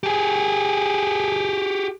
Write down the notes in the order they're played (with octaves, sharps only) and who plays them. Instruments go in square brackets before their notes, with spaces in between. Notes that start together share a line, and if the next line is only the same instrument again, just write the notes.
[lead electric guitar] G4 G#4